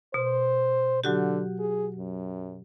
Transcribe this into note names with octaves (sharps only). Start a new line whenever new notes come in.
B2 C5
D3 F#3 F#4 G4
G#4
F#2